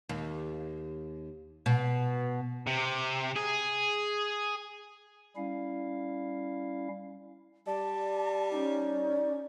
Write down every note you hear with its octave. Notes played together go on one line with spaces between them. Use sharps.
D#2
B2
C3
G#4
G3 C#4 E4 F5
G3 D5 A5
C#4 D#4